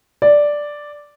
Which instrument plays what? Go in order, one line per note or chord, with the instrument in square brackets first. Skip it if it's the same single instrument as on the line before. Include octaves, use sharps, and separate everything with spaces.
[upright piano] D5